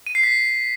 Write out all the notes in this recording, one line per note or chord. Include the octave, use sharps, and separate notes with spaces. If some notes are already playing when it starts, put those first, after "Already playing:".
D#7
C7
B6